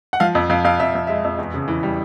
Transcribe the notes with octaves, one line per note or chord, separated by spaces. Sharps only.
F#5
F3 F5
F2
F2 F5
F2 F5
F2 E5
F2
G#3 E5
F2
E2
C#3
E3
G3